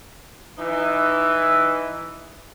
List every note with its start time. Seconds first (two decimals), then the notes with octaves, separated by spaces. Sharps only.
0.58 E3 D#4